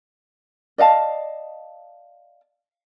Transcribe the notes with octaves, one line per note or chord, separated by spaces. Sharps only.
D5 D#5 F5 A5